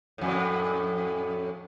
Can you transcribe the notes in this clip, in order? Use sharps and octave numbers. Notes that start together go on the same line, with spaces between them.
F2 A2